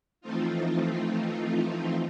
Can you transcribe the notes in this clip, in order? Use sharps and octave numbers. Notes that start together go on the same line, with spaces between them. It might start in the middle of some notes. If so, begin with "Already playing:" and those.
E3 F3 A3 C4 D#4 F4